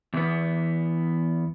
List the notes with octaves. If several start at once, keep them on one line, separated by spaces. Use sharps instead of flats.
E2 B3